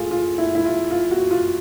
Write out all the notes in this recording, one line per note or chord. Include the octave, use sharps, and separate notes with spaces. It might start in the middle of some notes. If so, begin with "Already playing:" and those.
Already playing: A2 F4 G#4 A4
F4
E4
E4
F4
F4
F#4
F4